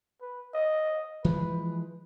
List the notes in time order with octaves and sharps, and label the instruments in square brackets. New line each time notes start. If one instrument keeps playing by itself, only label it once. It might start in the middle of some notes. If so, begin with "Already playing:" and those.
[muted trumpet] B4
D#5
[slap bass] E3 F3 G#3 [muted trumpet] B4